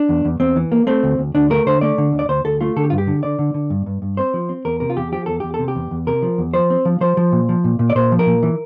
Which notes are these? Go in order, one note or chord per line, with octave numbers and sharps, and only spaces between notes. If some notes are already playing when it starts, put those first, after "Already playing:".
Already playing: D4
E2
E2
E2 C4
E3
A#3
A3 C4
D2
D2
D2 D4
A3 A#4
D3 C5
A3 D5
D3
D2
D5
D2 C5
D2 A4
A3 F4
D3 A4
G4
G2 F4
G4
D3
D3 D5
D3
D3
G2
G2
G2
C4 C5
F3
C4
E2 A#4
C3 A#4
F4
E2 G4
F3 G4
E2 A4
E2 G4
C3 A4
G4
E2
E2
C3 A#4
F3
E2
F3 C5
C4
F3
F3 C5
F3
A#2
F3
A#2
A#2
D5
A#2 C5
F3
A#4
A#2
E3